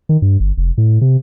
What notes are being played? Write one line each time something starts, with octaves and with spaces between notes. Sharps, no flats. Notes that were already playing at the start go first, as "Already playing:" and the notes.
D#3
G2
G1
F1
A2
C3